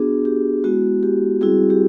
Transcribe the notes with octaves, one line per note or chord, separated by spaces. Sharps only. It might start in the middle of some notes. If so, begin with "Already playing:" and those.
Already playing: B3 D4 F#4 G#4
G4
G#3 B3 E4 F#4
G4
G3 C4 E4 F#4 G#4
G4